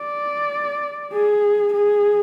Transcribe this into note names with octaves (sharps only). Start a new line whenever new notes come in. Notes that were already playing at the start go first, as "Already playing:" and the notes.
Already playing: D5
G#4
G#4